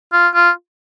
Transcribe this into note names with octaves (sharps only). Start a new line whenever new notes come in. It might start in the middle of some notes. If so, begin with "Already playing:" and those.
F4
F4